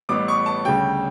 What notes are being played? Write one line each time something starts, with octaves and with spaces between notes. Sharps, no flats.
A1 A2 G3 B3 D6
C#6
A5
D2 C#3 G3 G5